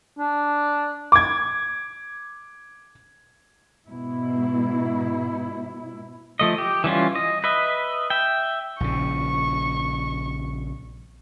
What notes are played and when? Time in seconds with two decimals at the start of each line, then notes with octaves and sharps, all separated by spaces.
0.19 D4
1.12 D6 G#6
3.89 G#2 B2 E4
6.39 F3 A3 D#5
6.58 G4
6.84 E3 G3 C#4 F4
7.15 D#5
7.44 B4 D#5 E5
8.10 E5 G5
8.80 A#1 C#3 C#6